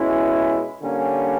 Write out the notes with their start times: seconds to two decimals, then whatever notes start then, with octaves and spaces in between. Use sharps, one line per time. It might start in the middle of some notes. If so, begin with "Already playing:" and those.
Already playing: B2 G#3 C#4 E4
0.82 D3 G3 A#3 C#4